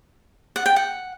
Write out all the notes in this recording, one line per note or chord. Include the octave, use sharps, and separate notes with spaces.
F#5
G5
F#5